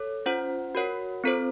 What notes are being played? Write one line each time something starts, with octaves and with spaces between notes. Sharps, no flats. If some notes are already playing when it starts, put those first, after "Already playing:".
Already playing: A4 C#5
C#4 F4 C5 F#5
F#4 A#4 C#5 F#5
C4 F4 A4 C5